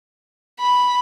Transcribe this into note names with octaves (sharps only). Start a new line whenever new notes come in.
B5